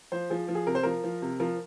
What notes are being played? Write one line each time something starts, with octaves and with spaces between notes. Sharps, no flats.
F3 C5
F3 G#4
F3
G#4
C3 A#4
C5
F3 A#4
F3
C3
F3 A#4